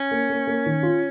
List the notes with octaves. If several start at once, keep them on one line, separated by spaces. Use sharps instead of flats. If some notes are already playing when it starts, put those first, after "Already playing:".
Already playing: C#4
A#3
A#3
A#3
D#3
F4